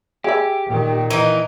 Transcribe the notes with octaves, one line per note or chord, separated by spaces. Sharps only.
G4 G#4 E5
A#2 D#3
E3 A#3 D#4